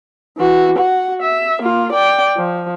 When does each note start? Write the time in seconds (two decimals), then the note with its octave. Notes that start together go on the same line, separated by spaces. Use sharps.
0.38 E3 F#4
0.78 F#4 F#5
1.22 E5
1.62 A#3 F4
1.93 D5 G5
2.37 F3